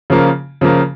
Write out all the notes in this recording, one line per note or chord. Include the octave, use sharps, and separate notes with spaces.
C#3 F3 A#3
C#3 F3 A#3